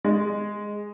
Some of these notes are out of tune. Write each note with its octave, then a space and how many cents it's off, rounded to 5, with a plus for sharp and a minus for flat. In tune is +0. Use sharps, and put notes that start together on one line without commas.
G#3 -5